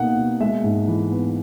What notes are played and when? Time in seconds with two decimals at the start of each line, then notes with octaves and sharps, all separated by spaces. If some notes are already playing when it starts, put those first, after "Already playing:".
Already playing: B2 A#3 D#4 F#5
0.17 B2
0.41 G#3 E5
0.64 G#2
0.88 E3
1.11 B3